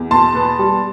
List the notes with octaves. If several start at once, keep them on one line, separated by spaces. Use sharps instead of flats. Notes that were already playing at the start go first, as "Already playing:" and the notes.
Already playing: E2
B2 A5 C6
B3
G3